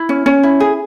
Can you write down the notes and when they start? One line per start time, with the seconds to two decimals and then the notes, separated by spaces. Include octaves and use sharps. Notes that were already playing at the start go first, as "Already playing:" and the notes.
Already playing: E4
0.09 C#4
0.26 C#4
0.43 E4
0.60 G#4